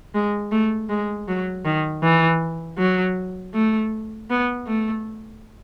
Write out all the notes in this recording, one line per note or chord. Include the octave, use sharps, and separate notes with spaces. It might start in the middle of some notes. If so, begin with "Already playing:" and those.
G#3
A3
G#3
F#3
D#3
E3
F#3
A3
B3
A3